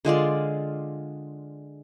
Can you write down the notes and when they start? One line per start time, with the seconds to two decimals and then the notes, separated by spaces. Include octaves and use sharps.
0.05 D3 G#3 F4 D5